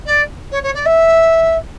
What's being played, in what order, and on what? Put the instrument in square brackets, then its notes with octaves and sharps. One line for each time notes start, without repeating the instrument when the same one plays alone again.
[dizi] D5
C#5
C#5
D5
E5